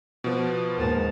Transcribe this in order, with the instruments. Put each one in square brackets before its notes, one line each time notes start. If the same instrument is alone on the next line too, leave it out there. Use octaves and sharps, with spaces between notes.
[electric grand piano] B2 F3 [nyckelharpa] B4
[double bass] D#2 G#2 [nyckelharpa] A#4 A5